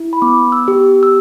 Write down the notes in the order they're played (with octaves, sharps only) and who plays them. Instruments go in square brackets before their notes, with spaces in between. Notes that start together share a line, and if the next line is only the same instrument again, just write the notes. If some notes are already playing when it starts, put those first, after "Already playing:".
Already playing: [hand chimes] E4
B5
B3 D6
E6
G4
E6